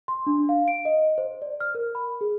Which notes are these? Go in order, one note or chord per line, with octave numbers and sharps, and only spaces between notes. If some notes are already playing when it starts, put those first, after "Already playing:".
C6
D4
F5
D7
D#5
C5
D5
F6
A#4
B5
G#4